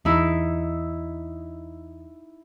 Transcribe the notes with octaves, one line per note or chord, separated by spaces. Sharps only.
E2 D#4 E4